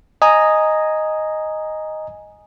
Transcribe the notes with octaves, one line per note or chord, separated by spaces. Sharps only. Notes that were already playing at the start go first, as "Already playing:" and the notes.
D#5 G#5 A#5 D#6